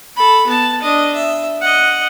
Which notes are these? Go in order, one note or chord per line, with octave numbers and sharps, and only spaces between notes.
A4 B5
B3 A5
D4 D#5
E5
D#5 F#5